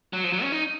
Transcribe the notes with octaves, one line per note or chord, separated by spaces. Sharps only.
F#3
F3
F#3
C#4
D#4